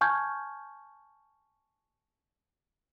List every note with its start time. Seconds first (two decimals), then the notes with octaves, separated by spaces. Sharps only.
0.01 G#5 A5 C#6 F6 G6 G#6